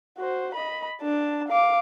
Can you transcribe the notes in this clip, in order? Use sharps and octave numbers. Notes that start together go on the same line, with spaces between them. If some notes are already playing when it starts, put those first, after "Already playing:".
F#4 C5
D#5 B5
D4 A5
F5 D6